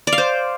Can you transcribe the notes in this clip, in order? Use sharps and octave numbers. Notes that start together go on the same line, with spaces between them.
D5
F5
C5